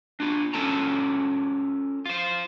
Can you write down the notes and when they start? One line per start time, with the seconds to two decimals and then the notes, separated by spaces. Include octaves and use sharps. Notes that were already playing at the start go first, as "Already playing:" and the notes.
0.20 D4 F4
0.53 C#4 F4 A4 A#4 A5 A#5
2.06 F4 C5